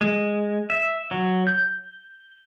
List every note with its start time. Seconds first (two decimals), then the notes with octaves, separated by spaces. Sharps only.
0.01 G#3
0.70 E5
1.11 F#3
1.47 G6